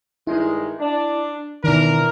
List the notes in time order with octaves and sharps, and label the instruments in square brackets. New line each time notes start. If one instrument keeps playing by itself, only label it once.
[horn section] G2 D#3 G#3 [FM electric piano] E4
[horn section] D4
[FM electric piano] B2 D#3 [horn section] E3 D4 A#4